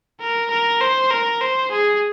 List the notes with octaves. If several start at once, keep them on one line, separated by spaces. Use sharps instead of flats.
A#4
A#4
C5
A#4
C5
G#4